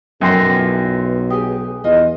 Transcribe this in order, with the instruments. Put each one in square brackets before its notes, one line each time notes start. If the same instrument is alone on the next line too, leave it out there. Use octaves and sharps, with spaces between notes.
[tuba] B1 [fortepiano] F#2 G5 [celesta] C6 A#6 C7
[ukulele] E4 F4
[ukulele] G4 G#4 G#5 [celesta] D#6
[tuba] E2 [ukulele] F4 D#5